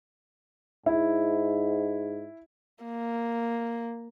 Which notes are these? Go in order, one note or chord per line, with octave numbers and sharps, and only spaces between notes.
G#2 E4
A#3